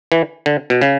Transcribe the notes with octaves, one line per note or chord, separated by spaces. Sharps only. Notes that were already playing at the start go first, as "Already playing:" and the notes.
E3
D3
B2
C#3